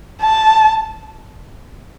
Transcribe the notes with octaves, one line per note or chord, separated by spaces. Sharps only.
A5